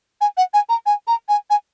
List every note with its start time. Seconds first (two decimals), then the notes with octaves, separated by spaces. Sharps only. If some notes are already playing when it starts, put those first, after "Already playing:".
0.21 G#5
0.37 F#5
0.54 G#5
0.69 A#5
0.86 G#5
1.08 A#5
1.29 G#5
1.50 G#5